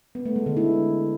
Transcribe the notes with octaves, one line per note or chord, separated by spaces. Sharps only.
B3
A3
G#3
D3
E4